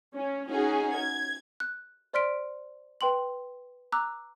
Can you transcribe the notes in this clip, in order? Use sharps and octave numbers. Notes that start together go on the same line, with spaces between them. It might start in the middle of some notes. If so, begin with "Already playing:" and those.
C#4
C#4 D#4 F#4 G#4
G#6
F#6
C5 D5 C6 F6 B6 D7
B4 G5 C6 F#7
A#5 D6 E6 F#6